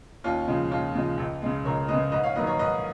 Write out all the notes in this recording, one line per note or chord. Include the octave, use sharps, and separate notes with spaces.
D#2 C#4 F4
C#3 F3 G#3
D#2 C#4 F4
C#3 F3 G#3
C#2
C#3 G#3
C#2 A#4 C#5
C#3 G#3 B4 D#5
G#2 B4 D#5
C#5 F5
D#3 F#3 A#3 B4 D#5
A#4 C#5
G#2 B4 D#5